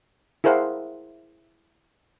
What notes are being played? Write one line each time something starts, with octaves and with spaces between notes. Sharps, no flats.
E4 G#4 A#4 C5 F5 F#5